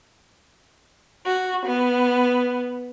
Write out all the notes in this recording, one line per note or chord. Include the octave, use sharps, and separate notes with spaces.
F#4
B3